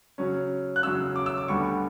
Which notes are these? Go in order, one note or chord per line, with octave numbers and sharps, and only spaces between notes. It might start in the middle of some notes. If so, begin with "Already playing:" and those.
C#3 F#3 C#4
F#6
C#3 F#3 C#4 E6
D6
E6
D6
D2 D3 G3 B3 C#6